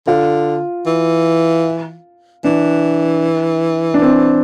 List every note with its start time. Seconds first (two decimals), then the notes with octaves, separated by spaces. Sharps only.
0.07 D3 F4
0.87 E3
2.44 E3 D4
3.94 D4
4.02 C4